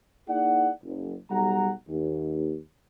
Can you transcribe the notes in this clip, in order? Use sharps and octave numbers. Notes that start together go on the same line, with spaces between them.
A#3 D#4 E4 G#4 D5 F#5
F#1
B1 G3 F#5 A#5
D#2